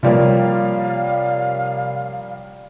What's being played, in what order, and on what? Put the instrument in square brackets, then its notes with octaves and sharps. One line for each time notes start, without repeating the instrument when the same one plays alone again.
[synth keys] C3 C#5 [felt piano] F3 G3 A#3 [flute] F5